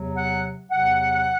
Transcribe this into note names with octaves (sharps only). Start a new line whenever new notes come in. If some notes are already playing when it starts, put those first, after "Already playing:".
Already playing: E2 C3 F#3
F#5
E2 C3 F#3 F#5